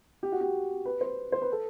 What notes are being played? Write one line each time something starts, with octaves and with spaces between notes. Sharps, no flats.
G4
F#4
G4
B4
C5
C5
B4
A4